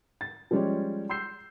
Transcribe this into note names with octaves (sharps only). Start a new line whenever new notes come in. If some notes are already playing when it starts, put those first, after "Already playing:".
A6
F3 G3 G#3 C#4 G4 C#5
C6 E6 G6 C7